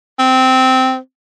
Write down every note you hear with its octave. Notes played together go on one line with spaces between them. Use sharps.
C4